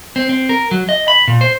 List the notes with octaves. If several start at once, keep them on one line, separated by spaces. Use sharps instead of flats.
C4
C4
A#4
F#3
D#5
B5
A#2
C5